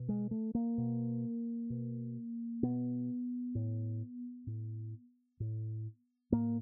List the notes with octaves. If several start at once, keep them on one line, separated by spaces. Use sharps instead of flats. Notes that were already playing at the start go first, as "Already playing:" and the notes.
Already playing: B2
G#3
A3
A#3
B2
B2
B2 B3
A2
A2
A2
A2 A#3